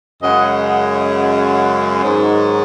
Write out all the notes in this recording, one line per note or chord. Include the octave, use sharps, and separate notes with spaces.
F#2 C#3 G#3 D#5 F#5
D#5 F#5
D#5 F#5
G#2 D#3 F#3